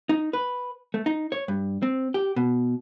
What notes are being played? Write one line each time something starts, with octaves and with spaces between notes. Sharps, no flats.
D#4
B4
A3
D#4
C#5
G2
C4
G4
B2